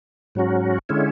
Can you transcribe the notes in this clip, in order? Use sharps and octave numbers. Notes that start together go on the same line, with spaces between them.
G#2 F#3 C#4 F#4
D3 G#3 C#4 E4